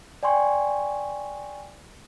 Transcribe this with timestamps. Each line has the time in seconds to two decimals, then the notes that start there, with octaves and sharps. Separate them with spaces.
0.23 D5 G5 G#5 C6 C#6